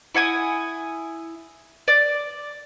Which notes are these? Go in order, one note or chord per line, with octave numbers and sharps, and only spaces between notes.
E4 F#5 G#5 D#6
D5